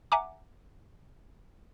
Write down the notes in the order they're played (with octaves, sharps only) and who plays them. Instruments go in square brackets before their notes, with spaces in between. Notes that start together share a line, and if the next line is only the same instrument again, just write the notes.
[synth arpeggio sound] E5 F#5 G#5 A#5 D6